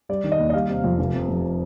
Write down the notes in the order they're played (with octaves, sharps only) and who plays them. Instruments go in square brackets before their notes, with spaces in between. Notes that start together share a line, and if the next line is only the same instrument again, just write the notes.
[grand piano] G3 D5
D#3
D#5
D#2
D#5
G3 F5
C3
F2
F1
C3
F2